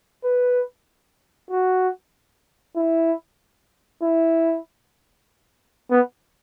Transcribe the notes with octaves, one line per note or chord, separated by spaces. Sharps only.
B4
F#4
E4
E4
B3